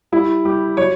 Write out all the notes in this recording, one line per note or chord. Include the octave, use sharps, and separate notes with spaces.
G3 E4
G3 G4
F#3 C#5